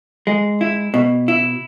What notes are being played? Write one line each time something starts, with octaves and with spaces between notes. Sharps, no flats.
G#3
E4
B2
E4